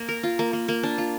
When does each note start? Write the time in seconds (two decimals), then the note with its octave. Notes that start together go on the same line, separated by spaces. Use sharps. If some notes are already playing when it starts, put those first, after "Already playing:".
Already playing: A#3
0.08 A#4
0.23 F4
0.39 A#3
0.53 A#3
0.68 A#3
0.83 D4
0.98 F4